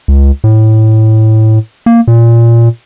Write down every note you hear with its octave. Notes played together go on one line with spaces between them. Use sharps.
C#2
A2
A#3
A#2